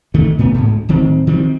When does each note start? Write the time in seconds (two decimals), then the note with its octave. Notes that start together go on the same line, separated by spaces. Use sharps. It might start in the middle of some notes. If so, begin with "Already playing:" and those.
0.14 D2 D#3 A3
0.39 A2 A3 B3
0.54 D2 G#2
0.89 D1 D#3 C4
1.27 D#3 F3 G3 C4